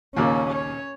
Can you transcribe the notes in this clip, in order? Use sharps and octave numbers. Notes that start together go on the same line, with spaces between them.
D#2 A#2 C#3 A#3 C#4
C#5